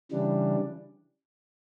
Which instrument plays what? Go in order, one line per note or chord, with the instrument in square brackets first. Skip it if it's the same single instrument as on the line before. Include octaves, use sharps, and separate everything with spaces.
[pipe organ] C#3 E3 G3 D4